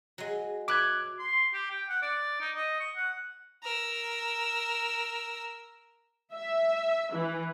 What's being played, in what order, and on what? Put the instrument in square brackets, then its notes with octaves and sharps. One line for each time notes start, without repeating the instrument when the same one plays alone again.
[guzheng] F#3 G#3
[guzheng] B4 C#5 E5 [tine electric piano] D6 F#6 G#6
[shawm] C6
G4
G5
F#5
D5
D#4
D#5
C#6
F#5
[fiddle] A#4 E6
[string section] E5
E3